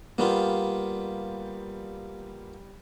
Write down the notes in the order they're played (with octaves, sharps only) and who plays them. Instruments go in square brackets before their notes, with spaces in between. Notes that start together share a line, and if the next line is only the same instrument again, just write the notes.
[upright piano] G3 G4 [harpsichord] A#3 B3 F4